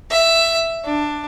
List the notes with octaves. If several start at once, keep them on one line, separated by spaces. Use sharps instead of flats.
E5
D4